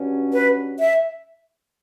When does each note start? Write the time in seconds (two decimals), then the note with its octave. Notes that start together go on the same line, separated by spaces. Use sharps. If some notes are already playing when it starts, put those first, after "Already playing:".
Already playing: G2 F#3 C#4
0.34 B4
0.80 E5